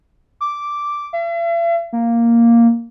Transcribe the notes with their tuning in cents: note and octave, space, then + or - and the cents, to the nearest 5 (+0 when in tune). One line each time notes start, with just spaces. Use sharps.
D6 -5
E5 +45
A#3 +0